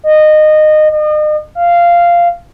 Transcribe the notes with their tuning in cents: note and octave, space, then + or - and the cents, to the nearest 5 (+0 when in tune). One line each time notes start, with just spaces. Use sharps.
D#5 -20
D#5 -40
F5 -10